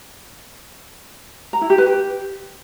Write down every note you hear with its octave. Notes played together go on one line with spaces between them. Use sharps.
A#5
E4
G4
B4
G4